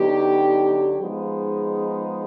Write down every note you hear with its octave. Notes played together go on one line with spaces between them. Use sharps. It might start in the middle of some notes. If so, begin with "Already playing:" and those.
Already playing: D3 F#3 B3 D#4 G4
F3 G#3 B3 D#4 G#4